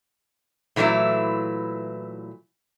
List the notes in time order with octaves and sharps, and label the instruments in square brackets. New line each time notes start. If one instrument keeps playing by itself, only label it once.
[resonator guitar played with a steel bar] A#2 E3 F#3 A3 E4